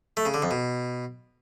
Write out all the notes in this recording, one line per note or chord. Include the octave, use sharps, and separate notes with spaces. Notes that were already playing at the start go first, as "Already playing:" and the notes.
A3
C#3
D3
F2
B2